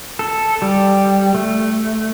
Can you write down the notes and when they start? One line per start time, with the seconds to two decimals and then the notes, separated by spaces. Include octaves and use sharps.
0.19 A4
0.62 G3
1.35 A3